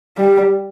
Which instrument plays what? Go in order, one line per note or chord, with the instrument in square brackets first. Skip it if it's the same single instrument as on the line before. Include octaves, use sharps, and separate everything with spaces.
[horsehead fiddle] G3